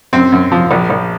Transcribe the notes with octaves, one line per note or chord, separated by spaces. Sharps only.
F#2 C4
F#2
F3
A#1
A#1